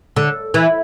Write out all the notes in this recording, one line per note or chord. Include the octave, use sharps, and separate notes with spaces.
D3
E3